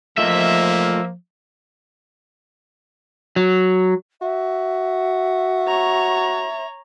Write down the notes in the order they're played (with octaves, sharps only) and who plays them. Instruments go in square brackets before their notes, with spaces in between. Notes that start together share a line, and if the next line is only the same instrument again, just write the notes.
[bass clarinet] F3 [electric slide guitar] A3 F4 D#5 [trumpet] A#3 [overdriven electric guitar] E5
[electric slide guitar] F#3
[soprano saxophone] F#4 [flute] E5
[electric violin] C#5 A#5